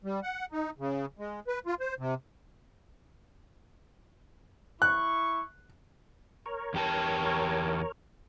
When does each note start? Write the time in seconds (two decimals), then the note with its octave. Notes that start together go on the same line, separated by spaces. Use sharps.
0.04 G3
0.23 F#5
0.52 D#4
0.79 C#3
1.19 G#3
1.48 B4
1.66 F4
1.80 C5
1.99 C3
4.82 E4 C#6 F#6
6.46 A#4 C#5
6.74 E2 G4 A5